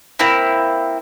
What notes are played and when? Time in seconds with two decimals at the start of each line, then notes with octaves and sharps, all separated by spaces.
0.19 A#3 C4 E4